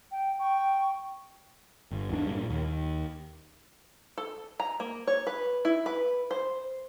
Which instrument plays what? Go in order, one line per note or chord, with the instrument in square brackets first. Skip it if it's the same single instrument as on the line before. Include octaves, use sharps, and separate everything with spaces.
[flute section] G5
G5 C#6
[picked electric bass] G1
E2 G#2 D4
G2 A#2
D#2
[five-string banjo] A4
A#5
A#3
C#5
B4
E4
B4
C5